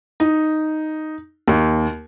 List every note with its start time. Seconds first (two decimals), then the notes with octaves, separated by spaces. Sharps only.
0.20 D#4
1.48 D#2